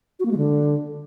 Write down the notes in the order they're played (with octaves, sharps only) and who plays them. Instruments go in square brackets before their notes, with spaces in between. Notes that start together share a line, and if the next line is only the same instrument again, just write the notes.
[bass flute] F#4
A#3
G#3
D3